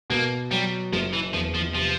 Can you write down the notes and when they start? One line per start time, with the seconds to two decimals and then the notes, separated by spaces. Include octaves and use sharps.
0.10 B2 A#3
0.51 F#3 G3
0.93 F#1 F3
1.13 E3
1.34 E2 F3
1.55 F3
1.75 C3 F3